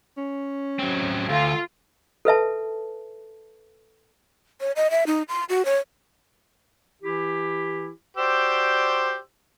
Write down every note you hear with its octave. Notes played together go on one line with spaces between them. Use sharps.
C#4
F#3 C4
D2 F4 A4
A4 B4 E5 A5
C#5
D#5
E5
D#4
C6
F#4
C#5
E3 E4 G4
F#4 G4 C5 D5 E6